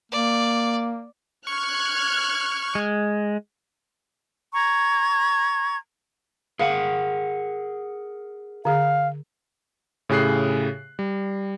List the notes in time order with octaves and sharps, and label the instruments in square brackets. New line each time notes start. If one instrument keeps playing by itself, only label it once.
[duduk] A#3 [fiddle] D5
[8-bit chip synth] C#6 [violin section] F6 F#6 G#6
[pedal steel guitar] G#3
[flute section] A#5 C#6 G#6
[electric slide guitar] G#4 A#4 F#5 [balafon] F5
[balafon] D3 G#4 [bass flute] F5
[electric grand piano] A2 C#3 G4 G#4 F#6 C7
G3